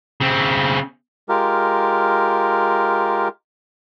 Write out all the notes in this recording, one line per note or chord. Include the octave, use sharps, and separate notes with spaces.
C#3 C4
G#3 F4 G4 A#4